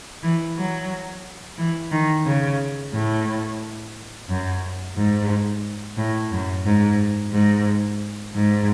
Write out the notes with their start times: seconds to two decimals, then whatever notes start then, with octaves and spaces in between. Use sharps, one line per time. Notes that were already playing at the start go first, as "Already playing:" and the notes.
0.23 E3
0.57 F#3
1.58 E3
1.92 D#3
2.26 C#3
2.93 A2
4.28 F#2
4.96 G#2
5.98 A2
6.31 F#2
6.66 G#2
7.32 G#2
8.34 G#2